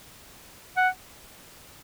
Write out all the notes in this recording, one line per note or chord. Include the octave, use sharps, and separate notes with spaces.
F#5